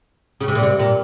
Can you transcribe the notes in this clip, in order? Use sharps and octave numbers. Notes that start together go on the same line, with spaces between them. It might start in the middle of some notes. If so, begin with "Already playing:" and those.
C#3
C3
A#2
C3
A#2